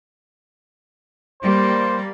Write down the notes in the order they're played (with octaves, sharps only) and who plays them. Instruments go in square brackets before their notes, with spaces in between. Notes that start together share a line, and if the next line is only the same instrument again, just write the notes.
[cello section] G3 A#3 [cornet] C5